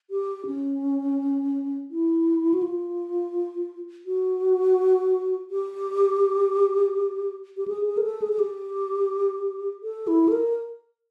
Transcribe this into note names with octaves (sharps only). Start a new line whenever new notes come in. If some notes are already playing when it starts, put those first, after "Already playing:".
G4
C#4
E4
F#4
F4
F#4
G4
G4
G#4
G#4
A#4
A4
G#4
G#4
G4
A4
E4
A4
A#4